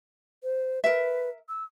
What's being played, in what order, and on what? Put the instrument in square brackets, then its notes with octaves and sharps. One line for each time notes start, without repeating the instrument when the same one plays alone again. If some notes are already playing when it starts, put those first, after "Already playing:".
[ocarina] C5
[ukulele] A#4 E5 [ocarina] B4
[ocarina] E6